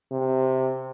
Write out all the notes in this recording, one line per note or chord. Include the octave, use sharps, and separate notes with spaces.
C3